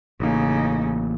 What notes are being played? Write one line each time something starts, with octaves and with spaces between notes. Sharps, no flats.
A1 C#3 A#3 D#4